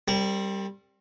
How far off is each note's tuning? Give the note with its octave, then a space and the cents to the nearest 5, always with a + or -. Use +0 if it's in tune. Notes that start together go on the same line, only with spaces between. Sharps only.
G3 +0 C4 +30 A#4 -30